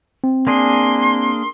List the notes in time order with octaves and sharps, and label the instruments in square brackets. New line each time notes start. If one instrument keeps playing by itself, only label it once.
[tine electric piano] C4
[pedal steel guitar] A#3 D4 G#4 [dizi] C6